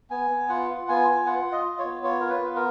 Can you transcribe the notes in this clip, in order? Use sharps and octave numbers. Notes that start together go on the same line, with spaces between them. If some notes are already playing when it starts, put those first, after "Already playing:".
B3 G#5
B3
F4 F#5
F4
B3 G#5
F4
F4 F#5
F4
D#5
F4
C#5
B3
F4 C#5
F4 A#4
B4
B3
A#4